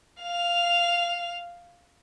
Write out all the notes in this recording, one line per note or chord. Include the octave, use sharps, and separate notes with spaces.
F5 F7